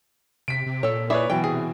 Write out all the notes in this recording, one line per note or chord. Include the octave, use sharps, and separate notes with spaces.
C3 B6 D7
C3
A#2 A4 C#5
E4 G#4 B4 C#5 D5 E5
B2 E3 F#3 G5
C3 G#4